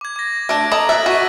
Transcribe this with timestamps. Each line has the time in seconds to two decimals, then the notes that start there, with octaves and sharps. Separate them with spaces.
0.01 D6 G#6
0.16 D6 A#6
0.49 A3 D4 A#6 D7
0.72 A4 D#5 A#5 F#7
0.89 E5 E6 F#6 A6
1.06 F#4 C#6 B6 D#7